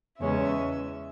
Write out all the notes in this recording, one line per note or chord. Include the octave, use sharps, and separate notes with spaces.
E2 C#3 G#3 C#4 E5